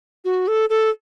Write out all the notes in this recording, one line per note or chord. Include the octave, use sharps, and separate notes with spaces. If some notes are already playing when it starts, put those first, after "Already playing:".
F#4
A4
A4